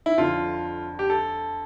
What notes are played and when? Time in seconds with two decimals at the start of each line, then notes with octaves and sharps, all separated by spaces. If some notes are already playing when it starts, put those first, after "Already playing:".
0.06 E4
0.18 F2 D3 F4
0.99 G4
1.10 A4